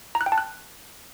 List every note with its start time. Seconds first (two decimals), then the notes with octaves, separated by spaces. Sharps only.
0.15 A#5
0.21 F#6
0.26 G5
0.32 A5
0.38 F#6